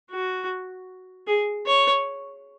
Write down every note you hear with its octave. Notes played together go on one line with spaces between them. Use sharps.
F#4
G#4
C#5